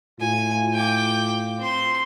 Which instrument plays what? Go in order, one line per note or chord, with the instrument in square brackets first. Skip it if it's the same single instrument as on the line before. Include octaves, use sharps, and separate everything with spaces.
[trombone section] A2 F4 [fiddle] G#5
[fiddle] G5 D6
C4 C6